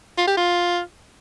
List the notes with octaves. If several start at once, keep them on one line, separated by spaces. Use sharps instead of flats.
F4
G4
F4